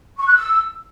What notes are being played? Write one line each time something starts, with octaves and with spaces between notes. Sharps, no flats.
C#6
F#6
E6